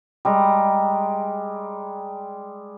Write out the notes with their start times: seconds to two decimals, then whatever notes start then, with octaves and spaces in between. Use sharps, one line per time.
0.25 G3 G#3 A#5